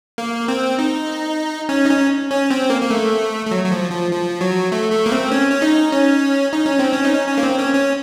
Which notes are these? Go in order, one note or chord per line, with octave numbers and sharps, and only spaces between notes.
A#3
C4
D#4
C#4
D#4
C#4
C#4
C4
A#3
A#3
A3
A3
F#3
F#3
F3
F3
F3
F#3
A3
A3
A#3
C4
C#4
C#4
D#4
C#4
D#4
C#4
C4
C#4
D#4
C#4
C#4
A#3
C4
C#4
C#4